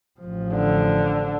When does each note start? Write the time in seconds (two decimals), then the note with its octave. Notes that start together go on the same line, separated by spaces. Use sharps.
0.20 A1 F3
0.54 D3